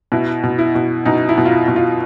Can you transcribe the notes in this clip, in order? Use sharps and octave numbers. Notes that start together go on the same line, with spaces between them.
B2 E4
B2
E4
B2
B2 D#4
E4
B2
F4
E4
B2
F4